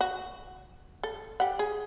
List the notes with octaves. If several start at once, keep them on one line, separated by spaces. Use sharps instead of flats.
F#4
A4
G4 F#5
G#4